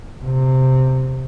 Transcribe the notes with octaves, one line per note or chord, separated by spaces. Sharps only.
C3